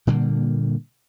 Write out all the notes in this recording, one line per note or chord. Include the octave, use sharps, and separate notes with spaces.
A#2 D3 G3 A#3